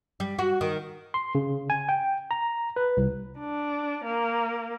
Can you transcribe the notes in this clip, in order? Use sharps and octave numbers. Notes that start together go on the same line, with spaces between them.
G3
F#4
D#3
C6
C#3
G#5
G5
A#5
B4
C2
D4
A#3